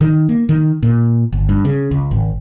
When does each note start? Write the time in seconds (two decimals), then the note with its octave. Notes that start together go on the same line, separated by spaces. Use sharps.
0.01 D#3
0.29 A#3
0.49 D#3
0.83 A#2
1.32 G1
1.49 G2
1.65 C#3
1.91 C#2
2.11 G#1